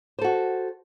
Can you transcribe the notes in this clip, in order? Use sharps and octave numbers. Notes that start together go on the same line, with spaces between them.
F#4 A4 C5